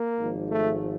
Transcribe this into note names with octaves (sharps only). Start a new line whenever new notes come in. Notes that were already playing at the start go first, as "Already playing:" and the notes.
Already playing: A#3
G#1 G#2 F3
A3